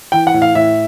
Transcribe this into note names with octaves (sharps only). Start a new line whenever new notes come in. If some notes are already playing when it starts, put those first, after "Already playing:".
E3 G5
F#5
A2
F5
A2 E5